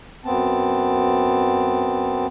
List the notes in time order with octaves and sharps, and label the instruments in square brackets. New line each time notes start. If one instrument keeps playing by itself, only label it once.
[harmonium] F#2 B3 C4 A5